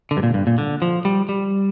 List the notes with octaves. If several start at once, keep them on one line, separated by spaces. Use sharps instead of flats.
D3
G2
A#2
G2
A#2
D3
F3
G3
G3